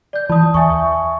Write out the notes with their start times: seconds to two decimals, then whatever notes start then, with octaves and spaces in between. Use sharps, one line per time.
0.13 D5 G6
0.30 E3 A5 D#6
0.54 D#2 E5 G#5 C#6